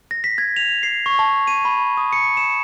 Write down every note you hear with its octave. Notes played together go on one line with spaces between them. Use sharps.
A#6
B6
G#6
F7
C7
C#6
A5
D#7
B5
D#6
C#7
E7